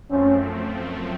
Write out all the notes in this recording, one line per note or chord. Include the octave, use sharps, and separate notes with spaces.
F#2 F3 A3 C4 C#4